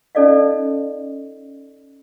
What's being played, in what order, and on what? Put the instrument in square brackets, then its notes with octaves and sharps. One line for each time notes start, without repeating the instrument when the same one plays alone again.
[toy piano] C#4 D#4 A4 D5 D#5 F5